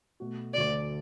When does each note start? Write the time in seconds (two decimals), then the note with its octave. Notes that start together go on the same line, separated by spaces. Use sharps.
0.20 B2 A3 F#4
0.54 D2 D3 A3 F#4 D5